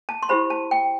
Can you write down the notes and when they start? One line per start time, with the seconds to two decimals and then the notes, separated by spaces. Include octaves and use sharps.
0.09 A5
0.23 C6
0.29 E4 G4 C5 B5
0.50 A5
0.71 G5